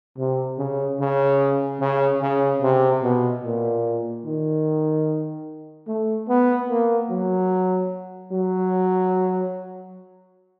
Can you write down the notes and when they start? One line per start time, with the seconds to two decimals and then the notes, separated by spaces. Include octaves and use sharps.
0.17 C3
0.58 C#3
1.00 C#3
1.80 C#3
2.22 C#3
2.62 C3
3.03 B2
3.44 A#2
4.25 D#3
5.87 A3
6.29 B3
6.69 A#3
7.10 F#3
8.32 F#3